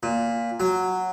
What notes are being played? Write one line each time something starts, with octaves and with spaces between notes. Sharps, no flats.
A#2
F#3